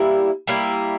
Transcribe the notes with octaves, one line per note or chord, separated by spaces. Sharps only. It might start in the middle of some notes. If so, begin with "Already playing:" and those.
Already playing: G3 A#3 E4
G3 A#3 E4